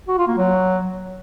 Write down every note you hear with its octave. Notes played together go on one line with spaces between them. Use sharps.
F#4
F4
A#3
F#3